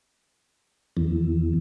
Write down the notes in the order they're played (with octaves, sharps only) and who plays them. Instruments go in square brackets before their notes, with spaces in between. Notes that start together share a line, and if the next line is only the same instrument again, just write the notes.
[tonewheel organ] E2